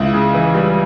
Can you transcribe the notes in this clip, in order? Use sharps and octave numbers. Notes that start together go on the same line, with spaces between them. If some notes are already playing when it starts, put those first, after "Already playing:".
Already playing: C#2 E4
C#3
E3
G3